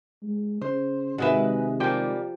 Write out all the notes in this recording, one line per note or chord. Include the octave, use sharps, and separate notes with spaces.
G#3
C#3 C5
C3 D#3 G#3 F#4 B4 E5
F3 G3 A#3 G4 G5